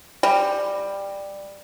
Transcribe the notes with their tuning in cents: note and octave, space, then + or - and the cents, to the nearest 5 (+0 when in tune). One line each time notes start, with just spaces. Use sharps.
G3 +10